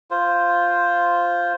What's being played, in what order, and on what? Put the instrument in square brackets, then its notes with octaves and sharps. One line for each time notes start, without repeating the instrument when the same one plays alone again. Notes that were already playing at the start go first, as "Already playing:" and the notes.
[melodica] F4 C5